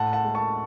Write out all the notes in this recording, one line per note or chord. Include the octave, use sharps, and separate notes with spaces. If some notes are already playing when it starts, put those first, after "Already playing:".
Already playing: A2 F#5 A5
F#5 A5
G#3
A5 C#6